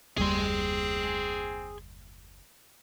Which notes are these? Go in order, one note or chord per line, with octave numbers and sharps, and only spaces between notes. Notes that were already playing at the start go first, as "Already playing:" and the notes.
F#1 D#2 G3 C4 G#4 C6